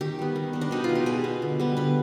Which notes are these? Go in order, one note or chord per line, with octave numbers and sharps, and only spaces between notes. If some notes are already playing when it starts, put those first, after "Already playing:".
D#3 G4
G3 B3
D#3
G3 B3
D4
B2 D#4
B3 F4
G4
B2 G#4
B3
D3
G3 B3
D3 B4